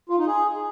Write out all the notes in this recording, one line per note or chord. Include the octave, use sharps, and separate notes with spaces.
F4
D#4
G#4